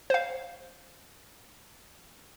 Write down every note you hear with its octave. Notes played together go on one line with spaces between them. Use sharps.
C5 F5